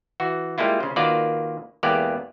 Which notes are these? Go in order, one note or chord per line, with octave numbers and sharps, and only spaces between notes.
E3 F#4
G3 G#3 A#3 E4 F4
C#3 C5
D#3 A#3 F4 F#4 B4 D5
E2 G#3 A#3 B3 G4 D5